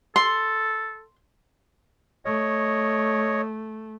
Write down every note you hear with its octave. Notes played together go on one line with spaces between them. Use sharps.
A4 C6
A3 C#5 D#5